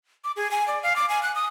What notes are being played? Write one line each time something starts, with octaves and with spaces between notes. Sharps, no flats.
D6
G#4
G#5
D5
F5
D6
G#5
F#6
D#6